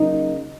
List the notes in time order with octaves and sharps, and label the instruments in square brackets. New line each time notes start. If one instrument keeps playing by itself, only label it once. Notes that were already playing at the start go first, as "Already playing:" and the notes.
Already playing: [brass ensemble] C#3 F#3 A#3 D#4